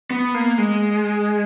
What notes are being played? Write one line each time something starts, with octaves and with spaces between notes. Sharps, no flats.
B3
A#3
G#3